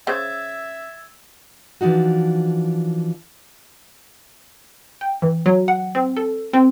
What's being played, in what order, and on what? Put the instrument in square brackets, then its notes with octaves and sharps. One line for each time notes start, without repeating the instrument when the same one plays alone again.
[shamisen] C#3 C5 [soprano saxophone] E5 [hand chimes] E6 G#6 A6
[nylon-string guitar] E3 F3 D4 D#4 F#4
[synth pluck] G5
E3
F#3
F#5
C4
A4
C4